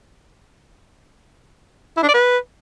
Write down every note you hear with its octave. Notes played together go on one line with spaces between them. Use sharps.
E4
D4
D5
B4